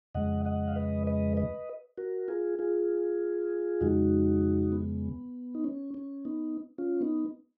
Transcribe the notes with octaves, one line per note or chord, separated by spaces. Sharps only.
F2 C#3 G#3 D#5 F#5
D#5 F#5
F5
B4 D#5
B4 D#5
B4 D#5
F#4 A#4
F4 G#4
F4 G#4
F2 C#3 G#3 D#4 F#4
B3
D#4
C#4
C#4
B3 D#4
C#4 F4
B3 D#4